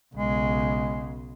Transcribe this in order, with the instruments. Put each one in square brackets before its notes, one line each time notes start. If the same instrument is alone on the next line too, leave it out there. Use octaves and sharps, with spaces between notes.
[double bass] B1 C#3 [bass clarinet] G#3